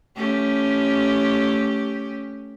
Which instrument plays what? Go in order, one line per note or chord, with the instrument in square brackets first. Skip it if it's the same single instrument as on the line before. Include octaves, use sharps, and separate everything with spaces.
[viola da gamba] A3 C#4 G4